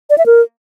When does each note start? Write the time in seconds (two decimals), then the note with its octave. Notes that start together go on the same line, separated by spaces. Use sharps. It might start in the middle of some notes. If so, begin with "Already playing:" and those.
0.10 D5
0.18 E5
0.26 A#4